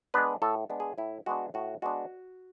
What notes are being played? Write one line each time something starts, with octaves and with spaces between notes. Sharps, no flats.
G#3 B3 D4 B4
A2 A4
G#3 B3 D4
G#4
A2 E4
G#3 B3 D4 F#4
A2 F#4
G#3 B3 D4 F#4